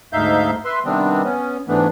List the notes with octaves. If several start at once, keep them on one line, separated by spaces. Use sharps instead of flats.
D2 G#2 D#4 E5 F5 G6
B4 E5 C6
C3 D#3 G3 B3 C4 D4
B3 C#4
G#2 E3 A3 B3 D4